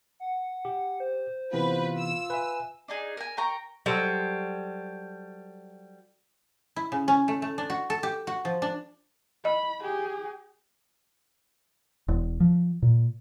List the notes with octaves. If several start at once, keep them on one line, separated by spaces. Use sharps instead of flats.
F#5
G4
C5
C3 E3 B3 F4 B4
E6
B4 E5 G#5
D4 D#4 G#4
A#4 G#5
A#4 G5 A#5 C#6
F#3 G3 A4 C5
E4
C#3
C#4
A3
A3
D4
F#4
A4
G4
F#4
F3
D4
D#5 B5
G4 G#4
E1
F3
A#2